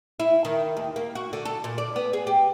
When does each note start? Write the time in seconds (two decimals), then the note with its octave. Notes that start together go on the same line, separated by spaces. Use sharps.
0.20 E4
0.45 D#3
0.77 D#2
0.96 A#3
1.15 F#4
1.33 D3
1.45 A4
1.64 A#2
1.78 D5
1.96 B3
2.13 G#4
2.27 G4